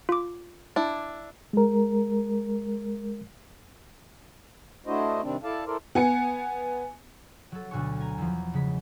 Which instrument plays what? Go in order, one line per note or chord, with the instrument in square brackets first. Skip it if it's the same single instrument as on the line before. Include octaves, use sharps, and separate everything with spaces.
[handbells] F4 D6
[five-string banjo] D4 E4
[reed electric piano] G#3 A#4
[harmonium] A3 D4 E4 F#4 C5 D#5
C3 D#3 G3 C4 D4
E4 A4 D5 F5 A5
E4 A4 A#4 C5 D5
[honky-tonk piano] B3 G#5 C#7
[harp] F#3 A4
D2 B2 F#4 A4 G#5 C#6
G#5 A#5
E2 F3
C#3 G#3 B6